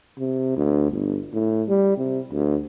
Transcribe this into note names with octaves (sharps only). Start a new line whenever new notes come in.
C3
D2
G1
A2
G3
C3
D2